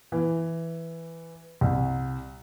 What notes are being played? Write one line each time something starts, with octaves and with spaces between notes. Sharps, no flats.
E3
C2